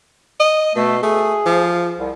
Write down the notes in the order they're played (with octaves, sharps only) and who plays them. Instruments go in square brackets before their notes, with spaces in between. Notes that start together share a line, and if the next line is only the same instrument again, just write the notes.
[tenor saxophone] D#5
[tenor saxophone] B2 [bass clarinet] A3
[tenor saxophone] A3 [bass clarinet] G#4
[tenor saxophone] F3
[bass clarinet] C2